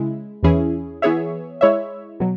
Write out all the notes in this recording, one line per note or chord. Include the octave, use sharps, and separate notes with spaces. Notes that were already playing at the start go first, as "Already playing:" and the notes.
Already playing: C#3 G#3 E4
E2 E3 C#4 E4 G#4
E3 B3 G#4 C#5 E5
G#3 E4 C#5 E5
B2 F#3